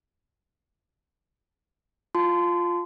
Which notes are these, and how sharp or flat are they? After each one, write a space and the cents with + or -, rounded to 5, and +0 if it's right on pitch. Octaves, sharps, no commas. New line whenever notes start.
F4 +0 A5 -15 C6 -25